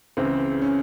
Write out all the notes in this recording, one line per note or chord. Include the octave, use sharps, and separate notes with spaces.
C#2 C#3 E3 C4
C#4